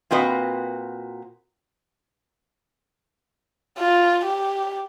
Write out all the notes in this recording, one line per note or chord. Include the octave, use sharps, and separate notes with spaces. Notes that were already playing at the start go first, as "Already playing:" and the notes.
A#2 C4 F#4 B4 D#5
F4
G4